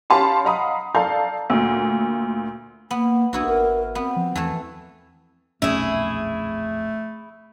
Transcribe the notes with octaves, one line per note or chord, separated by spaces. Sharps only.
C#4 G4 F5 A5 B5 C6
D#5 F5 F#5 A#5 B5 D#6
A4 D5 F5 A5 A#5 G6
D2 A#2
A#3 B3
B1 B3 D4 E4 F#4
G#1 A#4
B3 C4
F3
E2 E3 A3
D#1 B1 F2 A3 C#4 E4 G#4